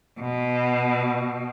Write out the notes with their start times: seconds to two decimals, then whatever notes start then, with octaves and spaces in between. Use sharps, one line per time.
0.21 B2